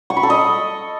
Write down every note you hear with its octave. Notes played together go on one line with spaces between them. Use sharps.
C#6
B5
A4
D#5